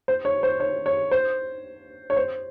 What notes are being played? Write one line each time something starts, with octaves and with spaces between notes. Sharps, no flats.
C5
C#5
C5
C#5
C#5
C5
C#5
C5